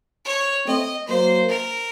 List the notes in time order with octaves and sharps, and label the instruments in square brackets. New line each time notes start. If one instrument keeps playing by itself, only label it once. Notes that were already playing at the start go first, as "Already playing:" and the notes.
[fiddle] C#5
[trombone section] A3 C4 [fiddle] D#5
[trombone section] F#3 A#3 [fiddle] C5
[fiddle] A#4